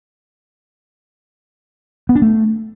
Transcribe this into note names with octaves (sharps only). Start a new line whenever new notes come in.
B3
D4
A3